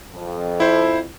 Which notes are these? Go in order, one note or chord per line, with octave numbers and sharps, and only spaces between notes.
F2
E4 C5